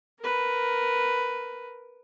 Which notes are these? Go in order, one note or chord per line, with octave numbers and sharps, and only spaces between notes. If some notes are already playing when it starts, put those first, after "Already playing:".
A#4 B4